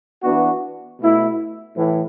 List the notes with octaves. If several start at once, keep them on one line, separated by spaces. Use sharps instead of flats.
E3 B3 D4 F#4
B2 A3 E4
A2 E3